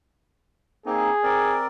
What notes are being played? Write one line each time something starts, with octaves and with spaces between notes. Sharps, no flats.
A#3 C4 D#4 G#4
C4 A#4 D5